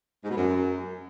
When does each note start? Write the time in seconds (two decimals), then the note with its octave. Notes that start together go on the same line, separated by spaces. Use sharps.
0.24 G#2
0.30 B2
0.36 F#2